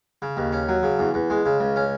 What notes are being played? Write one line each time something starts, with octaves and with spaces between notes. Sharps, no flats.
C#3
D#2
C#4
F#3
C#3
E2
E2
G#3
C#3
C#2
C#4